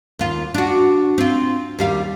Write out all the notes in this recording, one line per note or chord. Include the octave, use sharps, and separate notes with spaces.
D#2 F4
D4 F#4
C4 F4
D#2 G3 F5